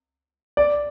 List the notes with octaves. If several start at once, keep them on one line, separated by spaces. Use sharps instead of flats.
D5